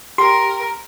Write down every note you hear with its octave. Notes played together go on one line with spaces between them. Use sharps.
G4 A#4 C6